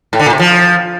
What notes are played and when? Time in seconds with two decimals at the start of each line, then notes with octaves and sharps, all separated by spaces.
0.13 A2
0.19 D3
0.26 A#2
0.33 C3
0.39 F3